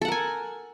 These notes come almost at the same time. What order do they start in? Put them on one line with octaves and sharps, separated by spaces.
A4 F#5 A#4 G#5